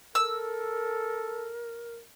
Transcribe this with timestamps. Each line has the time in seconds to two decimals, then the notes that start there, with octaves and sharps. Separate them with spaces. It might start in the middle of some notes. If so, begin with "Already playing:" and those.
0.15 A4 A#4 E6